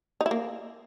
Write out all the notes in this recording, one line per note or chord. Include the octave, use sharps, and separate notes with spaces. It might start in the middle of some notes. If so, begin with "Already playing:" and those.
D#4
E4
A#3